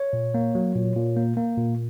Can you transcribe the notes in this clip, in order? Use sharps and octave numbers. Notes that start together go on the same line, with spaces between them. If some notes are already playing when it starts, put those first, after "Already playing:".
Already playing: C#5
A#2
A#3
F#3
A#2
A#2
A#3
A#3
A#2